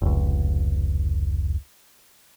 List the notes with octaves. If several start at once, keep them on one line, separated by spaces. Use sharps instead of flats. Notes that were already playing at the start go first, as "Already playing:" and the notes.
F1 C#2